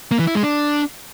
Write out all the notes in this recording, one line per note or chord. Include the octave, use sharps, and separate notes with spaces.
A#3
E3
E4
G#3
D4